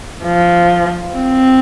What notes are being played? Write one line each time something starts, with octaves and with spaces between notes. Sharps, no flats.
F3
C4